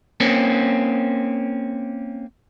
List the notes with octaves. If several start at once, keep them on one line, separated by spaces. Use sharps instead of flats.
A#3 C4 C#4